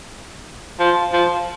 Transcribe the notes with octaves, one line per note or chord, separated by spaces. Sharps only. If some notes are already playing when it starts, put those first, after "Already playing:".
F3
F3